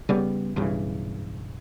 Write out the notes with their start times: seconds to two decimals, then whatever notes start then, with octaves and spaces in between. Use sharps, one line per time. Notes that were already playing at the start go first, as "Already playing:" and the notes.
0.09 C#3 G3 B3
0.56 B1 G2 C#3 E3